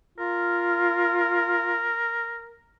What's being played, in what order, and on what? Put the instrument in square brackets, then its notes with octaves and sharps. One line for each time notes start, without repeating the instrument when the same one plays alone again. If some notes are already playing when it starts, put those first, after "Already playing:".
[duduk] F4 [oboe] A#4